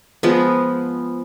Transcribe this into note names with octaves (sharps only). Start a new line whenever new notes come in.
F3 G#3 B3